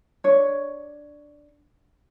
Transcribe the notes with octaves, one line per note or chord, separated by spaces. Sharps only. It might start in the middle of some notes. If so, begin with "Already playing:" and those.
D4 C#5